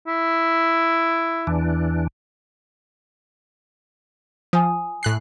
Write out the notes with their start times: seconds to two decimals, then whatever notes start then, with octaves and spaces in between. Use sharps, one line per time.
0.07 E4
1.47 E2 E3 D4
4.53 F3 G#5 D#6
5.03 A2 F#6 C7